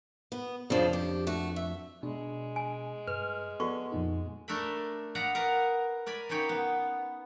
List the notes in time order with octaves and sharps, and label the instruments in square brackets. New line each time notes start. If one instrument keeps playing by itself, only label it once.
[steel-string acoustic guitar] B3
[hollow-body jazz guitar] F2 D4 [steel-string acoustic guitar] C#3 F3
[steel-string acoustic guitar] G4
A3 F#4
E5
[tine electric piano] B2 [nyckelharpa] G#3 [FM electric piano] D4
[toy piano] G#5
[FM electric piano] G2 [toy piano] B4 [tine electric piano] F6
[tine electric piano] B3 [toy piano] F#4 C#6 [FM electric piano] A4 D5
[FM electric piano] F2 A#2 D#4
[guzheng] A3 D4 A#4 E5 B5
D5 D#5 F5 F#5 A#5 B5
A#4 B4 D#5 F5 F#5
A#4 D5 G#5 B5
C#3 A#3 D#4 C#5 G5 B5
B3